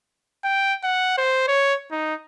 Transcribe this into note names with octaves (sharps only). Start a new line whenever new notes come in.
G5
F#5
C5
C#5
D#4